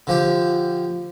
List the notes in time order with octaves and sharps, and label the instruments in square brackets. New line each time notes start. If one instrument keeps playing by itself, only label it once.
[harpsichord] D3 F3 G4